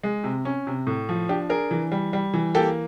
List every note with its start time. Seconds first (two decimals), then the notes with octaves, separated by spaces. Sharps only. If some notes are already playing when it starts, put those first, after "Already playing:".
0.03 G#3
0.24 C3
0.45 C#4
0.67 C3
0.87 A2
1.09 F3
1.29 D4 G4
1.49 D4 G#4 A#4
1.71 E3
1.92 G3
2.13 G3
2.34 E3
2.55 A#3 G4 A4